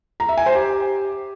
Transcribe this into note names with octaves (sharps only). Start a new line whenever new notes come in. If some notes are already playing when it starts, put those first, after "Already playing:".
A#5
E5
G#5
C5
G4